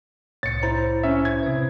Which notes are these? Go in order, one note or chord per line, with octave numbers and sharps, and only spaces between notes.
C2 A2 C#5 A6 C#7
E4 C5 A#5
C#4 E5
G#6
C3 B4